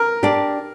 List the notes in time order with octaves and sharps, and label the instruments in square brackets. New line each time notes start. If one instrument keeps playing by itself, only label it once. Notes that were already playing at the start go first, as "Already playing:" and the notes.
Already playing: [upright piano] A#4
[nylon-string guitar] D4 G4 D5